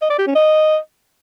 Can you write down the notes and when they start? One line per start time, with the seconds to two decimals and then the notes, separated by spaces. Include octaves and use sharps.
0.02 D#5
0.10 D5
0.19 G4
0.27 C#4
0.36 D#5